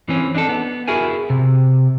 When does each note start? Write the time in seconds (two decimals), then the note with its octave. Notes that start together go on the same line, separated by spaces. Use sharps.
0.09 E3 C4 C#4
0.35 D4 D#4 G#4 A4
0.49 B3
0.88 E4 F#4 G#4 A#4 G#5
1.30 C3